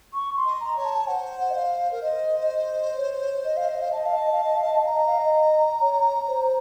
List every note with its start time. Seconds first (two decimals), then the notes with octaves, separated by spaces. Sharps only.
0.13 C#6
0.37 C6
0.45 D#5
0.60 A#5
0.76 C#5
0.84 A5
0.98 A5
1.08 C5 F#5
1.50 D#5
1.55 F5
1.91 A#4
2.02 C5 D#5
2.49 D#5
2.97 C#5
3.45 D#5
3.57 F5
3.69 D#5
3.82 F5
3.92 D#5 A5
4.06 F5
4.19 D#5
4.32 F5
4.44 D#5
4.56 F5
4.69 D#5
4.82 F5 A#5
4.94 D#5
5.06 F5
5.19 D#5
5.81 C#5
6.28 C5